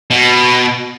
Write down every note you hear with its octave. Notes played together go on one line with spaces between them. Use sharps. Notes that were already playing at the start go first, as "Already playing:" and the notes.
B2